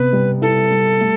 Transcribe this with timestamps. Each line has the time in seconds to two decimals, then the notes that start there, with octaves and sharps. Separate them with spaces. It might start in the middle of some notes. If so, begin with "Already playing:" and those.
Already playing: C3 B3 B4
0.13 G3
0.41 E4 A4
0.71 G3
1.01 A3